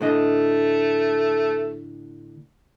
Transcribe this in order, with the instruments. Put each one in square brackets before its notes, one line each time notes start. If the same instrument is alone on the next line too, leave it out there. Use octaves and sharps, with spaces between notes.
[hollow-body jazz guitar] A2 D3 D#5 [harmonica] A3